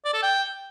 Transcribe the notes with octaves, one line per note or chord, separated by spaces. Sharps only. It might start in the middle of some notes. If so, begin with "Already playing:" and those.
D5
A4
G5